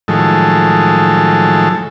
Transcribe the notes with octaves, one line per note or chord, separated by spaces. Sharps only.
A2 D#3 F3 F#3 G#3 A4